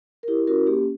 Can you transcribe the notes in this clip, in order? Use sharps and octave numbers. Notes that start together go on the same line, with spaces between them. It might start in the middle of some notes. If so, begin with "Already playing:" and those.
A#4
E4 G4
C#4 F#4 A#4
A#3 G4